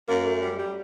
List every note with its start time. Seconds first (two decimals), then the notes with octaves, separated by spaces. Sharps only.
0.08 F#2 A#3
0.26 A3
0.42 G3
0.58 G3